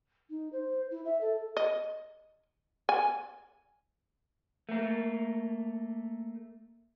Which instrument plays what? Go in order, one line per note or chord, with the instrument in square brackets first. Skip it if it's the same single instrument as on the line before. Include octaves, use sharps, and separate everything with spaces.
[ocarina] D#4
C5
E4
E5
A4
[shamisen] D#5
G#5
[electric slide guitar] A3 A#3